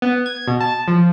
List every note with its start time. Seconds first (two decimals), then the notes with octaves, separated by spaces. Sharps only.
0.02 B3
0.26 G#6
0.48 B2
0.61 A5
0.88 F3